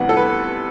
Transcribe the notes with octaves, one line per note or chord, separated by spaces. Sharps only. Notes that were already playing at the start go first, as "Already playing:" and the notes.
Already playing: D2 C3 E3 G3 B3 F#5
A4
B4